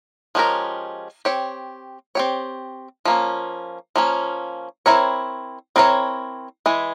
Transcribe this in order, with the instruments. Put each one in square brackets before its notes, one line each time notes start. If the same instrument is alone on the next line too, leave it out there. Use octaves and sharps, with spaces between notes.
[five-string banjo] F3 G#3 C#4 G4 A#4
C4 G4 C#5
C4 G4 C#5
F3 A#3 C#4
F3 A#3 C#4
C4 E4 A#4 C#5
C4 E4 A#4 C#5
E3 G#3